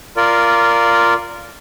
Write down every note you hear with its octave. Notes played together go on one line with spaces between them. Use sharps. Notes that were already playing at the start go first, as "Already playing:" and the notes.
F4 A#4 D5